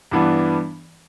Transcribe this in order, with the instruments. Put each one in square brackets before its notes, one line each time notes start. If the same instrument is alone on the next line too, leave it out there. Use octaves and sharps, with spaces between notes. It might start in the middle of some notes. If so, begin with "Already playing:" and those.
[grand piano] G2 E3 B3 D4